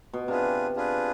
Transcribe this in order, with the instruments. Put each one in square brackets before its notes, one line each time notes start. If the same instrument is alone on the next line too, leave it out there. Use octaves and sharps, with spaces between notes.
[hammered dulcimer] B2
[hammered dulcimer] C3 [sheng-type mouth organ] D4 F4 G#4 B4
[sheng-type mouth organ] D4 F4 G#4 B4